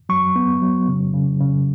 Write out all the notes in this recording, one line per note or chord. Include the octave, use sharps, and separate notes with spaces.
F#3 C#6
B3
F#3
C#3
C#3
C#3